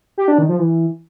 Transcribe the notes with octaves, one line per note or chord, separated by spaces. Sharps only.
G4
D4
D#3
F3
E3